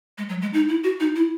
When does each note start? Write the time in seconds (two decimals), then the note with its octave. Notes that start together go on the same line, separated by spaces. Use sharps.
0.18 G#3
0.29 F#3
0.42 G#3
0.54 D#4
0.69 E4
0.84 F#4
1.00 D#4
1.16 E4